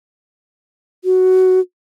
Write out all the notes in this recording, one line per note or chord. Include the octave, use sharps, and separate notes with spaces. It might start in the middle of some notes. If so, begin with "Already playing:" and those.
F#4